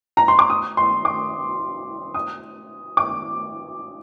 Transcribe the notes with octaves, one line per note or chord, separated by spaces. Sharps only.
A#5
C6
D6
D#6
C6
D6
D#6
D6